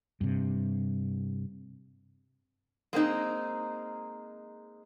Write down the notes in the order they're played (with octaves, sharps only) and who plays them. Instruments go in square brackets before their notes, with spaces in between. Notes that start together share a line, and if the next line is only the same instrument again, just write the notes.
[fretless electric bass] G2 C3
[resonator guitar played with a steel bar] G#3 A#3 C4 D#4